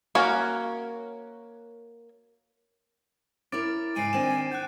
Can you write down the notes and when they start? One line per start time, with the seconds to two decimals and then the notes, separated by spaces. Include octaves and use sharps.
0.15 A#3 C#4 F#4 A#4
3.52 C#4 E4 A#4 D6 A6 D7
3.96 G#2 C#3 G#5 C7 D7 D#7
4.13 D#3 C4 D4 A6 E7
4.51 G5 F#6 G6